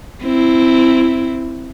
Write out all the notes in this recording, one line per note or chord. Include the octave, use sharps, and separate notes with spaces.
C4 E4